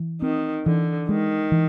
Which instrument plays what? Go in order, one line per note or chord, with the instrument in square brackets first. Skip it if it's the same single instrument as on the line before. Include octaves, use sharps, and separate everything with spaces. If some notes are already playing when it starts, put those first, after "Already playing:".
Already playing: [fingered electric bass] E3
[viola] D#3 [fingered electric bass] C4
[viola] D3 [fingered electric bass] E3
[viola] D#3 [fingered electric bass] G#3
[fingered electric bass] E3